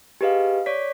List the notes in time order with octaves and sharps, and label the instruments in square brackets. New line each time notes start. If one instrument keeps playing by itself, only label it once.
[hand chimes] G4 G#4 B4 D#5 F5
C#5 D5 B6